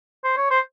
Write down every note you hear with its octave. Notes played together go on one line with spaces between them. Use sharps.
C5
C#5
C5